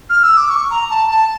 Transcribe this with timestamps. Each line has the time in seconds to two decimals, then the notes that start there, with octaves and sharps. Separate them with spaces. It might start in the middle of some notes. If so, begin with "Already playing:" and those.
0.10 F6
0.23 E6
0.37 D6
0.50 C#6
0.70 A#5
0.90 A5
1.11 A5